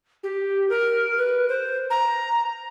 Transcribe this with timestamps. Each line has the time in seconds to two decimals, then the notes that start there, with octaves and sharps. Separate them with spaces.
0.23 G4
0.69 A#4
1.18 B4
1.49 C5
1.90 A#5